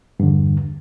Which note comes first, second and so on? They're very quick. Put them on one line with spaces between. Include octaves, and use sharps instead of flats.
G2 D3 E2